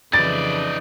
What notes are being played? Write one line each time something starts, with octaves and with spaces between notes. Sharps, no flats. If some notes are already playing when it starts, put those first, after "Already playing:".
F2 C#3 E3 D#4 D5 A6